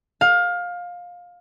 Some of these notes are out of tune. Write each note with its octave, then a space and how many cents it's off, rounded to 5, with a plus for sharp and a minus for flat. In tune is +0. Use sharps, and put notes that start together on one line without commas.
F5 +20